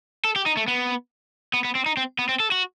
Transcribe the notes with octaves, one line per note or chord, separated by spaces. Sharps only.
A4
G4
D#4
A3
B3
B3
B3
C4
D#4
C4
B3
C4
A4
F#4